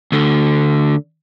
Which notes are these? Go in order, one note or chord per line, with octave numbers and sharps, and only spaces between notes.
D2 D3